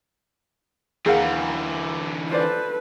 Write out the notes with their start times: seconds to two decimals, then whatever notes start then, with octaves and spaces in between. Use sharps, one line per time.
1.06 D#2 D3 E3 G#4 A#4 F5 F#5
2.31 F4 A4 B4 C5 D5